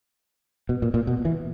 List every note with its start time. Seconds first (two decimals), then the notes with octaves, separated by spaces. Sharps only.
0.69 B2
0.82 A#2
0.94 A#2
1.07 B2
1.25 E3